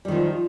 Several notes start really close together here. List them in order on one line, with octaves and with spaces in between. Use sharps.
G3 D#3 F3